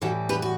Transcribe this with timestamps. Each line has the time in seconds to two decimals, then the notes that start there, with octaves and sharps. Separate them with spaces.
0.01 A2 E3 G3 F#4 A4
0.29 G4 B4
0.42 F#4